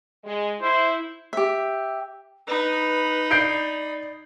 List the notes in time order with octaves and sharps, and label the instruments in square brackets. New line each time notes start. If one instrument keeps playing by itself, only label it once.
[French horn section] G#3
[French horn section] E4 [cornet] C5
[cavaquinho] G4 E5
[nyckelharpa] D#4 B5 [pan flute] B4
[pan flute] D5 [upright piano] G6 C7 D7